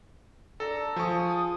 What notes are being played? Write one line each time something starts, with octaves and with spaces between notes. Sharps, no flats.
D4 A4 A#5 E6
F3 G#4 A5 C#6 D#6